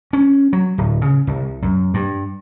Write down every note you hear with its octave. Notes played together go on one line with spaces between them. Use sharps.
C#4
F#3
D1
C#3
C2
F#2
G2